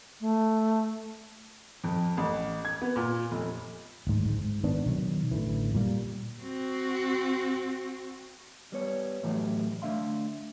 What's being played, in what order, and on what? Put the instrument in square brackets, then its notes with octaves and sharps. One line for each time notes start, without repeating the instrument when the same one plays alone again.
[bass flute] A3
[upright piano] F2
A1
G#6
B3
A#2
F1
[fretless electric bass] D1 G#1 G#2
G#2
D#3 B3 D4
B2 D#3 F#3
A1 D3 E3
A#2 G3 A#3
[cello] C4 F#4
[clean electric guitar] G3 B3 C#5
A2 E3 F#3 A3 G4
D3 A3 D4 E5 F5 C6